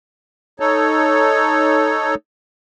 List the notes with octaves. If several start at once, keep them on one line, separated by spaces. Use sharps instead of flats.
D#4 A4 C#5